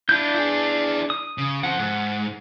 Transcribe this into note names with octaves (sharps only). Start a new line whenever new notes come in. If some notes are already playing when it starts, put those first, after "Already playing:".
D4 E4 F4 G6
E4 G#4
D#6
C#3
F3 C4 F#5
G#2